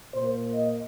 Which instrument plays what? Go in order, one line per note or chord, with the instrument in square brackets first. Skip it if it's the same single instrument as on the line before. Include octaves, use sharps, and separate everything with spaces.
[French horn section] A#2 A#3 C5
D#5